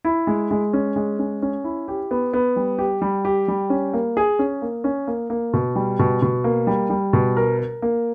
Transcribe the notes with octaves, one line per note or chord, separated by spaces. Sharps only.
E4
G#3
G#3
C#4
G#3
C#4
C#4
E4
G4
B3
B3
G3
G4
G3
G4
G3
C#4
A#3
G#4
C#4
A#3
C#4
A#3
A#3
B2
G3
B2
B2
A#3
G3
G3
B2
A#4
A#4
A#3